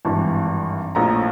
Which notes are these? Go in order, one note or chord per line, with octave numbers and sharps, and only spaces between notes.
G#1 G2 E3 A5
A#1 A2 F3 A#5